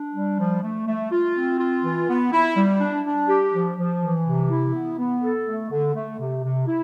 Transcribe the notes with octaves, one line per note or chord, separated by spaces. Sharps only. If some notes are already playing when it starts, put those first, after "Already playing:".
Already playing: D4
G3
F3
A3
A3
F4
C4
F4
E3
B3
E4
G3
D4
D4
G4
F3
F3
E3
C3
E4
B3
B3
A4
A3
D3
A3
C3
C3
E4